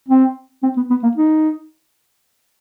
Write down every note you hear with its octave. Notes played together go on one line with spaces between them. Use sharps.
C4
C4
B3
B3
A#3
D#4